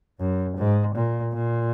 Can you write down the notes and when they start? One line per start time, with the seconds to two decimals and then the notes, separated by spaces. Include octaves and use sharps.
0.19 F#2
0.57 G#2
0.95 A#2
1.34 A#2